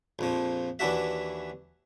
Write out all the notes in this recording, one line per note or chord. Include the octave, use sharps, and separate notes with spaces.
A#1 F2 F3
D#2 E3 D4 F#4 E5